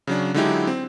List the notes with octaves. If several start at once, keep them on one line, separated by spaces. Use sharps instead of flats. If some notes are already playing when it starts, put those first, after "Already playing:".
C#3 F#3 D4
D3 F#3 G#3 D#4 E4 G4
C4